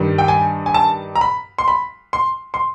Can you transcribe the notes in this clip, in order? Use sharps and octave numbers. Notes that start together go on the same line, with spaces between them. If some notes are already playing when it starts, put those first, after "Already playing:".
Already playing: G2 D#3 G3
G5
G#5
G#5
A5
A#5
B5
C6
B5
C6
C6